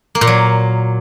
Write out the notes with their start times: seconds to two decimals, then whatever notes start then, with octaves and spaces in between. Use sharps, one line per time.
0.15 A#3
0.21 A#2
0.27 F#3